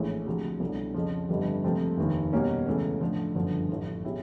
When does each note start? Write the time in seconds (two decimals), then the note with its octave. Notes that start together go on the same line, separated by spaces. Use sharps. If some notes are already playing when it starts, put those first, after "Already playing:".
Already playing: A#1 A2 E3 G#3 C#4
0.26 D2 C3 F3 G#3
0.60 C2 B2 F#3 A3 D4
0.94 F2 C#3 F3
1.29 G1 F2 D3 G3
1.64 C#2 C3 F3 A3 C4
1.97 F1 D#2 D#3
2.33 B2 G3 A#3 C#4
2.67 C#2 C#3 E3 A3 C#4
3.00 A2 F3 A3 D4
3.35 G1 F#2 D3 F3
3.69 A1 A2 F3
4.04 B2 G#3 C#4 E4 G4